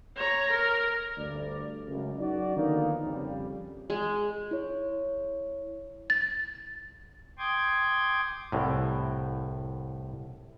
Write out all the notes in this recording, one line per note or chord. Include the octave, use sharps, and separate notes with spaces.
C#5 A#5
A#4
D2 G2 D5
C#2 F#2
F#2 D#4 F#4 D5
D3 D#3 F3 A#3 B3 D#4
F2 C#3 G3
G#3
E4 C#5
A6
G5 C6 D6 D#6 G6 G#6
C2 A2